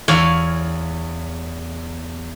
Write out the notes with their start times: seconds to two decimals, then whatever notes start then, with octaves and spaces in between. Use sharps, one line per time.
0.08 E2 C#5 F5